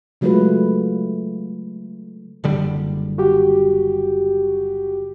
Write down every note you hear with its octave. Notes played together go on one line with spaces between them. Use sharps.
C#3 F#3 G#3 A3 F4 B4
F#1 D3 G3
F#4 G4